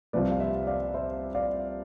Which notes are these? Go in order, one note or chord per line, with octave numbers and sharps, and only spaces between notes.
C2 C3 F3 B4 D5
F5
C5 E5
D5 F5
C5 E5
D5 F5